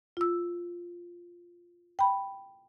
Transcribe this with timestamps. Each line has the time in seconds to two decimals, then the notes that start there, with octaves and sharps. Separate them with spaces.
0.17 F4 E6
1.99 G5 B5